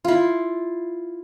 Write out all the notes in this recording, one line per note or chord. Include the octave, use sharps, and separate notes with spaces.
E4 F4